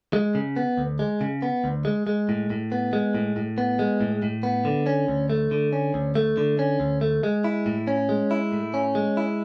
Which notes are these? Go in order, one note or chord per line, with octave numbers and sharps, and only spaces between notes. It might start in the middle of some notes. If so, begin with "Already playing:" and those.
G#3
C#3
B3
D2
G#3
C#3
B3
D2
G#3
G#3
A2
A2
B3
G#3
A2
A2
B3
G#3
A2
A2
B3
D3
C#4
D2
A3
D3
C#4
D2
A3
D3
C#4
D2
A3
G#3
E4
A2
C#4
G#3
E4
A2
C#4
G#3
E4